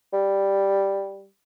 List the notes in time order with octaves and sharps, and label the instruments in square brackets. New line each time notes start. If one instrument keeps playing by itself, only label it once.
[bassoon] G3